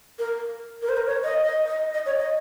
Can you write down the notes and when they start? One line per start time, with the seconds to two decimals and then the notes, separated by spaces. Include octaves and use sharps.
0.19 A#4
0.82 A#4
0.89 C5
0.97 A#4
1.07 C#5
1.24 D#5
1.44 D#5
1.66 D#5
1.94 D#5
2.06 C#5
2.18 D#5